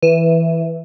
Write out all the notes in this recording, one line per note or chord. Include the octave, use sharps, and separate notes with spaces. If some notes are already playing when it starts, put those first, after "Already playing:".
E3